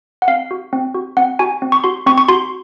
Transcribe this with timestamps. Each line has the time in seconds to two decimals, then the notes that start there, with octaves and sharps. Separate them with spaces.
0.22 F#5
0.28 C4 F5
0.51 F#4
0.73 C4
0.94 F#4
1.17 C4 F#5
1.39 F#4 G#5
1.62 C4
1.72 C#6
1.84 F#4 C6
2.06 C4 C#6
2.17 C#6
2.28 F#4 C6